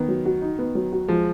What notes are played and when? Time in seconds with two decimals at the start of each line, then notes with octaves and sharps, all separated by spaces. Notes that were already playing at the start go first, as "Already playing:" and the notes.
Already playing: D#3 B3
0.08 F#3
0.25 F#4
0.42 D#4
0.59 B3
0.75 F#3
0.92 F#4
1.08 F3 G#3